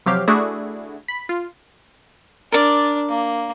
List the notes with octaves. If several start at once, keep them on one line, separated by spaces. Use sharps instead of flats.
C3 F3 F#3 G4 F5
A3 D4 E4 F#4 G#4
B5
F4
D4 A#4 D5
A#3